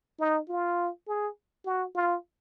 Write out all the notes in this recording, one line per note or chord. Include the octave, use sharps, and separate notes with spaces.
D#4
F4
G#4
F#4
F4